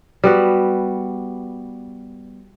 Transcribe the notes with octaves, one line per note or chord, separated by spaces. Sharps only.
G3 B3 F#4